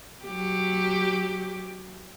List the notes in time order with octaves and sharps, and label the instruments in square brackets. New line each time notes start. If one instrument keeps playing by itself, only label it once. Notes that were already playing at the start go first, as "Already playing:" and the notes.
[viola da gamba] F#3 G4